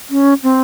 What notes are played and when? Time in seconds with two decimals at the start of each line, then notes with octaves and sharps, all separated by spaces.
0.10 C#4
0.43 C4